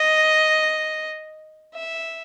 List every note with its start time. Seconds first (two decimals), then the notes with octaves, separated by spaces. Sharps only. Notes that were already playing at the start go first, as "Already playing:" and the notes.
Already playing: D#5
1.75 E5